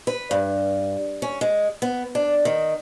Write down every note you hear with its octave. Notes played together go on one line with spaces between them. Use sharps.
B4
G2
C#4
G#3
B3
D4
D#3